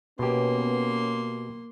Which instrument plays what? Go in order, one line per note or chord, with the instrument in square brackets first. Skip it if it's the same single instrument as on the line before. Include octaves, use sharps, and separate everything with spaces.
[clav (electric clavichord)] B2 G4 [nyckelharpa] A#3 C6 [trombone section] B3 C#4